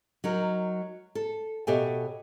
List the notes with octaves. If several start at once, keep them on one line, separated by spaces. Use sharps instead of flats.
F#3 D#4 A#4
A4
B2 G4 A4 C#5 E5 G#5